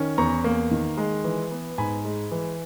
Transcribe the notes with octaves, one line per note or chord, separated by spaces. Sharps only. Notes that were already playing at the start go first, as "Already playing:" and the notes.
Already playing: D#3 C#4
E2 A#5 C#6
A#3
D#3
G#3
E3
B3
G#2 G#5 B5
G#3
E3